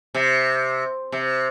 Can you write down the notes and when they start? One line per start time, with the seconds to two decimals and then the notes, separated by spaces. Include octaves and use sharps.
0.14 C3
1.12 C3